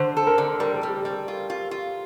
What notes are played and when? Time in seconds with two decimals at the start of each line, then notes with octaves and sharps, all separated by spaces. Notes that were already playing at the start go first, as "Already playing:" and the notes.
Already playing: D3 C5
0.17 A4
0.27 A#4
0.38 D3
0.60 G3 A#4
0.75 A4
0.83 G3
0.88 G4
1.02 G3 A4
1.28 F4
1.50 F4
1.71 F4